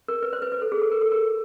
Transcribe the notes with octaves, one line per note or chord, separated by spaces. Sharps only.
A#4
B4
C5
B4
B4
A4
G#4
A4
A#4
A4
A#4